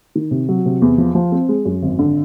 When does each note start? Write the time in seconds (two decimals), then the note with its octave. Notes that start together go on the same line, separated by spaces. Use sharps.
0.15 D#3
0.31 C3
0.49 F#3
0.66 C3
0.82 E2
0.98 F3
1.15 F3
1.32 C4
1.49 G#3
1.65 F#2
1.83 G#1
1.99 D3